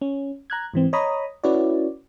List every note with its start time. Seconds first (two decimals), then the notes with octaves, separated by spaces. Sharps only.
0.01 C#4
0.50 A#5 F#6 G#6
0.74 G#2 E3 C4
0.93 C#5 D#5 A#5 B5 D#6
1.44 C#4 E4 F#4 B4 C#5 D5